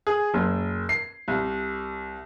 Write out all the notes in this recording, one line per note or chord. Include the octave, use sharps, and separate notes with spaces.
G#4
F#1
C7
C2